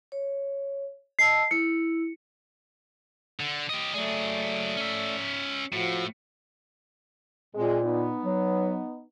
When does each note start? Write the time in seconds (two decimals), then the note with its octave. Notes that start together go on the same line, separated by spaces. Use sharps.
0.12 C#5
1.19 D#5 A5 E6 C7
1.51 E4 C#7
3.40 D3
3.69 G4 D#5
3.94 F#3 A3 G#4 D5
4.77 C#4 E5
5.73 A2 F3 F#4
7.55 A#2 G#3 C4
7.84 B3 D#4
8.24 F#3